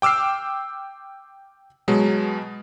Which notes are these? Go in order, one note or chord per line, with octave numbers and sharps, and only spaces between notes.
G5 D6 E6 F6 C7
B2 F#3 G#3 B3